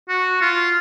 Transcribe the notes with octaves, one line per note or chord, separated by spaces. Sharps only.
F#4
F4